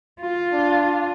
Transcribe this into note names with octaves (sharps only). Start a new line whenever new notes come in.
F4
D4